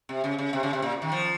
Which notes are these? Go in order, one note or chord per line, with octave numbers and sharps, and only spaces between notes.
C3
C#3
C#3
C3
C#3
C3
A#2
D#3
F3